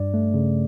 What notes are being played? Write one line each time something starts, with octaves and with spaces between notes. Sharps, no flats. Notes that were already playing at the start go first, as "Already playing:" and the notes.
Already playing: G2 D5
A3
C#3